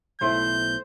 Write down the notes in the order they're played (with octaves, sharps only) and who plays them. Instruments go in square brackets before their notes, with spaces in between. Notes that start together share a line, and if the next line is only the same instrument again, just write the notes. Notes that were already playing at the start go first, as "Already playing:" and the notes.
[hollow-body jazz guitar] B1 A3 E4 [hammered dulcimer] C5 [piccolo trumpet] G6